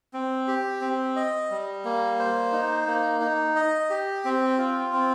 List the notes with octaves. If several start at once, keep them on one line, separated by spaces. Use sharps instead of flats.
C4
G4
C4
D#5
G3
A#3
C5
D#4
A#3
D#4
D#5
G4
C4
F4
C4